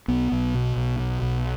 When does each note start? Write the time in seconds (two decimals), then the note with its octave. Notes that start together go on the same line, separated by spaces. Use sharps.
0.08 B1 B3
0.32 B1
0.55 B2
0.77 B1
0.99 B2
1.22 B1